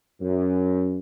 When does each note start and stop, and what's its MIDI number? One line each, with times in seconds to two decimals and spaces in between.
0.21 0.99 42